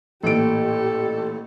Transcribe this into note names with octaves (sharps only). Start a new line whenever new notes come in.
A1 A#2 G4 A4 D7